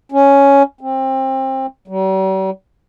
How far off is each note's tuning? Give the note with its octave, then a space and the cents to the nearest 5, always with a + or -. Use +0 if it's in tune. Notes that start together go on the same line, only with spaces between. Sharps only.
C#4 +5
C4 +25
G3 -45